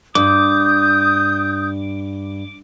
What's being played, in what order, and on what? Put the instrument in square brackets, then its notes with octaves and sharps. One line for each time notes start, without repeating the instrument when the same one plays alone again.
[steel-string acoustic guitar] G2 [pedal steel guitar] D6 [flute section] D#6 G6